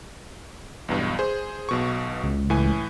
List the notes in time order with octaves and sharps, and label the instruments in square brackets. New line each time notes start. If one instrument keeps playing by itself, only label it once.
[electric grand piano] B1 E2 G2
G#4 C5
B1 B2 C#6
[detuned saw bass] C#2
[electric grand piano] A2 E3 G#5